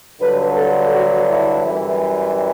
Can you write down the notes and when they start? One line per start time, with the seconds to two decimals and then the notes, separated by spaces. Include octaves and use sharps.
0.20 G2 D3 F#3 B4
0.55 A4
0.91 F#4
1.27 E4
1.63 F#2 E3 G3